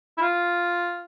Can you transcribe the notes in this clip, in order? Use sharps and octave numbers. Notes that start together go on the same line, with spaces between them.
E4
F4